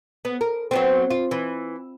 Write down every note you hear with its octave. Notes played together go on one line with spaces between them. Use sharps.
B3
A#4
F#3 B3 C4
F4
E3